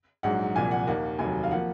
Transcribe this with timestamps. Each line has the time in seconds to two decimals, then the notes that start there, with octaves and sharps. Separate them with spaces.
0.23 A#1 G#2 F#3 F#5
0.55 C2 A#2 F3 G#5
0.71 F#5
0.87 D#2 D#3 A#3 F#5
1.19 F1 D#2 D#3 F#3 G#5
1.43 F5
1.51 F3 A#3 F#5